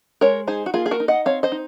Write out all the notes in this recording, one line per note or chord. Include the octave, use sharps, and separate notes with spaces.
G#3 A#4 C#5
D#4 G#4 C5
F#4
A#3 F4 G#4
G#4
F#4 A#4
D#4
D#5 F#5
C4 C#5 F5
C5 D#5
D#4